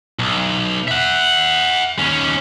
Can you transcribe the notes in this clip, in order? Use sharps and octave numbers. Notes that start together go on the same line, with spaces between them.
B1
E5 F#5
D#2 C#4